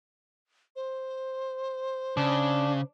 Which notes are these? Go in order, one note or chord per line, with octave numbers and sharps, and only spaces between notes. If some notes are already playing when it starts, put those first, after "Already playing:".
C5
C#3 D4